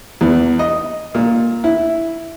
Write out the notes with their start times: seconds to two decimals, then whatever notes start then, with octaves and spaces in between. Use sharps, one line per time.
0.21 E2
0.59 D#5
1.15 A#2
1.64 E4